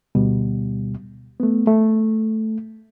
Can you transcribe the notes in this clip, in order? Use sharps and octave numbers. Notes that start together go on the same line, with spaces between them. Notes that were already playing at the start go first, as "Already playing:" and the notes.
D2 B2 G3
A3 B3
A3